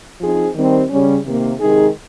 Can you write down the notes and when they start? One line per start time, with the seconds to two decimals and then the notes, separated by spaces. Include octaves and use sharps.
0.20 F3 C4 D#4 G#4
0.55 D#3 G3 C4
0.90 C#3 G3 C#4
1.25 C3 D#3 A#3
1.59 C3 D#3 G#3 D#4 G#4